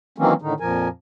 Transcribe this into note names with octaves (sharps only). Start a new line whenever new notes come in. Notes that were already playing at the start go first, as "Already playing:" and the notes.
D#3 E3 F#3 A#3 C4 C#4
A2 D3 D#3 D#4
F2 A#2 F3 A#4 G#5